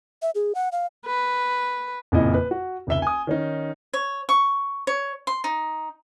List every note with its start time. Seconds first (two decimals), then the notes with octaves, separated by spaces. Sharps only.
0.22 E5
0.35 G#4
0.55 F#5
0.72 F5
1.06 B4
2.12 F#1 F2 A#2 C#3 E4 D#5
2.34 B4
2.51 F#4
2.87 F1 C#2 E5 G7
3.02 G#5 D#6
3.27 D#3 C#4 D#4
3.93 C#5
4.29 C#6
4.87 C#5
5.27 C6
5.44 D#4